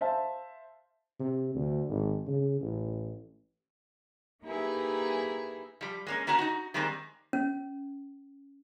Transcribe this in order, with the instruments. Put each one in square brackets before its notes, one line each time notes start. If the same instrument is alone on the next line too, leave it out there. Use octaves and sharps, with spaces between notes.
[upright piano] C5 E5 F5 A5
[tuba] C3
D2
G#1
C#3
A1
[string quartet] A#3 D#4 E4 G4 G#4 B4
[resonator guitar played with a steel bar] F3 G3
G#3 A#3 C#4
A#3 C#4 F#4 A5 A#5
D#4 F#4
D#3 G3 G#3 A#3 C4
[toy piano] C#4